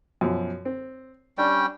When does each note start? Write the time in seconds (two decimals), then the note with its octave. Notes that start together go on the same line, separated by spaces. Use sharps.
0.21 F#2 B2 F3
0.65 C4
1.38 G3 C#4 D4 G5